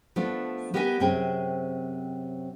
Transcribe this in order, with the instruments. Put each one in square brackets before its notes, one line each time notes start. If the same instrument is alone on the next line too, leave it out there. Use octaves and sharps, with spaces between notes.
[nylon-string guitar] F3 A3 B3 D4
B3 G4 A#4 D#5 F#5 G#5
F#2 C3 C4 G#4 G5